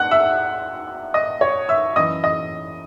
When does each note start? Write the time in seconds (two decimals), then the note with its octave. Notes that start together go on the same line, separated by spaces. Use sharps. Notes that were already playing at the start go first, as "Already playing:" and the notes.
Already playing: F#5 F#6
0.11 E5 E6
1.14 D#5 D#6
1.41 C#5 C#6
1.69 E5 E6
1.96 F#2 E3 D#5 D#6
2.24 D#5 D#6